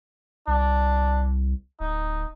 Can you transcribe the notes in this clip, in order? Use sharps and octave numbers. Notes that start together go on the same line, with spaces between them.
C2 D4
D1 D#4